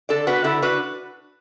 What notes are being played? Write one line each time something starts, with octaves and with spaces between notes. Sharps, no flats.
D3 A4 D5
B3 F#4 B4
D3 E4 A4
D4 F#4 B4